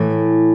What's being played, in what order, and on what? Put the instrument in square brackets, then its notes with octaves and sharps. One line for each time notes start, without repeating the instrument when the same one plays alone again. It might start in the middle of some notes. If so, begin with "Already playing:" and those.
Already playing: [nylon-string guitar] A2 E3